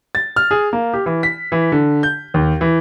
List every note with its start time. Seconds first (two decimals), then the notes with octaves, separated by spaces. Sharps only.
0.15 A6
0.36 F6
0.51 G#4
0.73 A#3
0.94 G4
1.06 E3
1.23 B6
1.52 E3
1.72 D3
2.03 G6
2.34 D#2
2.61 E3